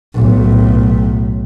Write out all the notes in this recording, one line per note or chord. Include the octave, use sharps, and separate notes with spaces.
B1 A2